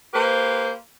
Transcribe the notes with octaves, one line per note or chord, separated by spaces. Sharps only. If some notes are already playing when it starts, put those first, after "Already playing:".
A#3 G4 B4 C5